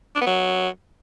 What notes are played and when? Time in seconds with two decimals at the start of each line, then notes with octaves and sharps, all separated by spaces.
0.16 D4
0.21 B3
0.27 F#3